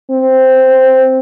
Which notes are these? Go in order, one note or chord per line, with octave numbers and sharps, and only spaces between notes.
C4